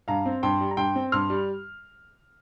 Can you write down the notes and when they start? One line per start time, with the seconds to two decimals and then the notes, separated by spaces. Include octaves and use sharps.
0.08 G2 F5 A#5
0.26 C4
0.43 G2 G5 C6
0.61 G3
0.71 A#5
0.77 G2 G5 C6
0.96 C4
1.12 G2 C6 F6
1.30 G3